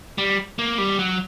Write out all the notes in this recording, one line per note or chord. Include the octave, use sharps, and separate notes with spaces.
G3
A#3
G3
F#3